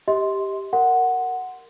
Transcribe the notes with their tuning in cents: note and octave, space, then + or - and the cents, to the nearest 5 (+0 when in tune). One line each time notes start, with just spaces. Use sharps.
G4 +0 D#5 +35 C6 +0
A#4 -10 F#5 +0 C6 -10